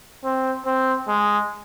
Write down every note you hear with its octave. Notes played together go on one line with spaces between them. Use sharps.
C4
C4
G#3